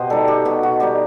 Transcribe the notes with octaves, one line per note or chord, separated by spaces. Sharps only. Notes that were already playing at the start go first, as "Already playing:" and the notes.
Already playing: B2 G4 C5 D#5
G3 D#4 A4
G4
B2 F#4
F#4
G3 D#4 G4